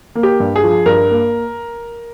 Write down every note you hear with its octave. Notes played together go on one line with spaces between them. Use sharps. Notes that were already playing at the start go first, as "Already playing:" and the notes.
A#3
G4
G2
G#4
F3
G2 A#4
A#3